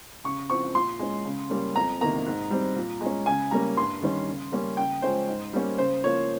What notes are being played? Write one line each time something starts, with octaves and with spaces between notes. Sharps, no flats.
C#3 C#6
F3 C4 C#6
A#2 C6
G#3 C#4
C#3
G3 A#3 C#4
F2 A#5
C3 D#3 A#3 A#5
G#2
G3 C4
A#2
G#3 C#4
C#3 G#5
G3 A#3 C#4 A#5
G2 C6
D#3 G3 C#4
C#3
G3 A#3 C#4
C#3 G5
F3 G#3 C#4 C5
G#2
G3 A#3 C#4
C#3 C5
F3 A#3 C#5